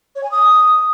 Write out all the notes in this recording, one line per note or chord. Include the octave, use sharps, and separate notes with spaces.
C#5
G#5
D#6